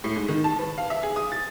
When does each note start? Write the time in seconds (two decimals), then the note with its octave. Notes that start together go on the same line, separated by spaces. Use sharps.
0.04 A2
0.16 G#2
0.29 D#3
0.44 A5
0.59 B4
0.78 F5
0.90 E5
1.03 G#4
1.16 D#6
1.32 A6